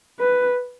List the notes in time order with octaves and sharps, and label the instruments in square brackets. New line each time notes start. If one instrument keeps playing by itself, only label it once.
[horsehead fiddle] B4